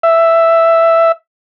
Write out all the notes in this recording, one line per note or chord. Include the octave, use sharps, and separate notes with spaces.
E5